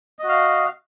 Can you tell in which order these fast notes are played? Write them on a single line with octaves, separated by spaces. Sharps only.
D#5 F#4 F5